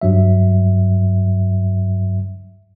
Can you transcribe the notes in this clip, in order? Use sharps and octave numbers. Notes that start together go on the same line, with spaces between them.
G2 F#3 E5